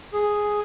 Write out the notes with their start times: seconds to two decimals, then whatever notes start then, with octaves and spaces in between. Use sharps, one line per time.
0.13 G#4